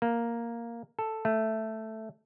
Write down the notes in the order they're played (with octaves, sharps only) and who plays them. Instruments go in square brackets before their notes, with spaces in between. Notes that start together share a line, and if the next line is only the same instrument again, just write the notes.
[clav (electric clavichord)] A#3
A4
A3